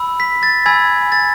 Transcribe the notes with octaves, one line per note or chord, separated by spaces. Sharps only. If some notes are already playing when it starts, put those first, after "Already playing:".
Already playing: B5 E6
B6
A6
G#5 B5 E6 G#6
A6